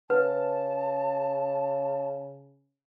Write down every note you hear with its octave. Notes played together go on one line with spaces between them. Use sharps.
C#3 B4 A5